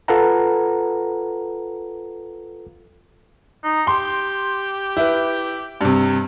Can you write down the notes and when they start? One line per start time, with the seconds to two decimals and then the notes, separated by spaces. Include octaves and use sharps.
0.08 F4 A4 B4 F5 F#5 A#5
3.64 D#4
3.87 G4 C6
4.97 E4 B4
5.81 G2 C3